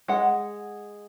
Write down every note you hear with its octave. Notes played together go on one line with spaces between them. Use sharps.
G#3 F#5